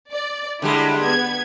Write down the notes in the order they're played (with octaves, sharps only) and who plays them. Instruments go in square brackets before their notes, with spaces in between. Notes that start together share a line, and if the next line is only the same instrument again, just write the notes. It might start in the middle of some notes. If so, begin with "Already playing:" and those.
[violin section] D5
[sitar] D3 G3 G#3 [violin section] E4
[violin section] B3 G#6